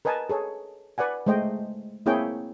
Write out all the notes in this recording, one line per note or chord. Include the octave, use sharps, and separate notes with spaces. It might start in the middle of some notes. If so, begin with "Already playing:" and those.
A#4 B4 D#5 G#5 A5
G#4 A4 C#5
B4 D5 F#5 G#5
G#3 A3 C5 D#5 G5
A#3 C4 E4 G#4 C#5 G5